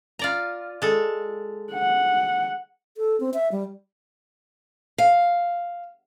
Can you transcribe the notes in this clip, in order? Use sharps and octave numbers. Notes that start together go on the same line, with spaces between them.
F4 D5 A#5
G#3 A4
F#5
A4
C4
E5
G3
F5